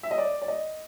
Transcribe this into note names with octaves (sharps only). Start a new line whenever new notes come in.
E5
D#5
D5
D5
D#5